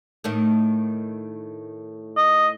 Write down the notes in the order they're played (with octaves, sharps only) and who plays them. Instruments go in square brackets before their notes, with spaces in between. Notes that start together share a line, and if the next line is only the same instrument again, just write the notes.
[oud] A2 D#3 A3
[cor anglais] D#5